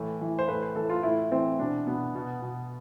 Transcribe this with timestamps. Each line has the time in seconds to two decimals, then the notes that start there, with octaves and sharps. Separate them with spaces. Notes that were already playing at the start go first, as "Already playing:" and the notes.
Already playing: A2 E3
0.21 E3
0.39 C5
0.48 A2 B4
0.62 C5
0.75 E3 A4
0.90 F4
1.03 A2 E4
1.31 E3 C4
1.59 B2 D4
1.87 B2 B3
2.15 B2
2.42 B2